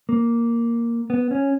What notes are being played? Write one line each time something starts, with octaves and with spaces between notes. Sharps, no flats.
A#3
B3
C#4